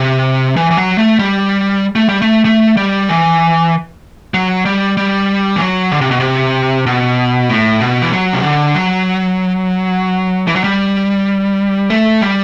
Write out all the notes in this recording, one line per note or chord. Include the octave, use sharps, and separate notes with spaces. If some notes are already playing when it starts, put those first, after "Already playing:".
Already playing: C3
E3
E3
F#3
A3
G3
A3
G3
A3
A3
G3
E3
F#3
G3
G3
E3
F#3
D3
C3
B2
C3
B2
A2
B2
E3
F#3
C3
D3
F#3
E3
F#3
G3
A3
G3